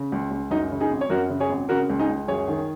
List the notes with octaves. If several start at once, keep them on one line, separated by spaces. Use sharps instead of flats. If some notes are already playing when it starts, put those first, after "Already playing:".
Already playing: C#3
C#2
C#2
F#2 D#4
C#3
D#4 G#4
G#1
C#5
F#2 F#4 A#4
C#3
G#4 C#5
G#1
C#3 F#4 A#4
C#2
D#4 G#4
C#2
F#2 G#4 C#5
D#3